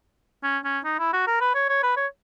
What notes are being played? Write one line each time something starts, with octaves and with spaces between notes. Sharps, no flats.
C#4
C#4
D#4
E4
F#4
A#4
B4
C#5
C#5
B4
C#5